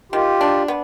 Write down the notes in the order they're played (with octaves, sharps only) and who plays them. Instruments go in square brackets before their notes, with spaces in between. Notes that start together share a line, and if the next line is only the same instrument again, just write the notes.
[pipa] D#3 [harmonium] F4 G4
[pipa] D4
B3